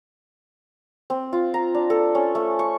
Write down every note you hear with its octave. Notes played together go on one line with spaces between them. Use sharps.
C4
F4
A#5
D4
A4
C#4
A3
C#6